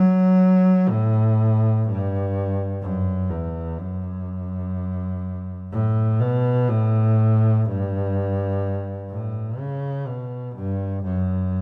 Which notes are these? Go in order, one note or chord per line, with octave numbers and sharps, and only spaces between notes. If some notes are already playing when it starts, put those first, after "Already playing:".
Already playing: F#3
A2
G2
F#2
E2
F#2
A2
B2
A2
G2
A2
C#3
B2
G2
F#2